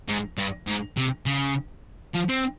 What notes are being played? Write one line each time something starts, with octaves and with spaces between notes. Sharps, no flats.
G#2
G2
G#2
C3
C#3
F3
C4